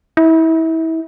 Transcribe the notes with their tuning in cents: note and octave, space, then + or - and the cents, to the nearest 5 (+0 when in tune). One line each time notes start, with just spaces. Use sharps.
E4 -30